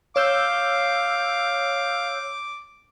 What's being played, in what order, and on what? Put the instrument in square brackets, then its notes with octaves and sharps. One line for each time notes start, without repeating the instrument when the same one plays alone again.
[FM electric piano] C#5 E6 G6 [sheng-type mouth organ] F5 [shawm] D6